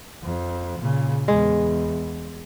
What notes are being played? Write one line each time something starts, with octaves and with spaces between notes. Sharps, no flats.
F2
A#2 C#3
E2 G#3